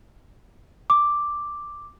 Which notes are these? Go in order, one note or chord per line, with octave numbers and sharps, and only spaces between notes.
D6